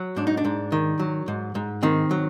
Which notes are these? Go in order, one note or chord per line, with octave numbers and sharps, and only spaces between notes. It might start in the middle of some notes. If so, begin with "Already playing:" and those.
Already playing: F#3
G#2 D4
D#4
D4
G#2
D#3
F#3
G#2
G#2
D#3 C4
F#3